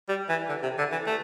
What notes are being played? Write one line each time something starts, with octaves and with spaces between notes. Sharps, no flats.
G3
E3
D3
C3
D3
E3
A3